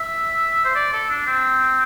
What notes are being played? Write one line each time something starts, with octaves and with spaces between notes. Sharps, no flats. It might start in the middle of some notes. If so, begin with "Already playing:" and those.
Already playing: E5
C5
D5
A4
D4
C4